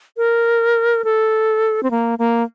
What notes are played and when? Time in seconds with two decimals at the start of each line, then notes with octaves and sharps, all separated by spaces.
0.17 A#4
1.04 A4
1.83 C4
1.91 A#3
2.19 A#3